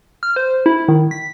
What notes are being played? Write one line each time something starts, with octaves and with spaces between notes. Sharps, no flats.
F6
C5
E4
D#3
B6